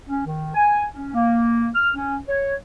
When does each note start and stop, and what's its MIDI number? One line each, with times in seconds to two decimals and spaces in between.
0.09 0.22 61
0.25 0.51 51
0.55 0.84 80
0.94 1.14 61
1.14 1.69 58
1.75 1.89 89
1.95 2.16 61
2.28 2.54 73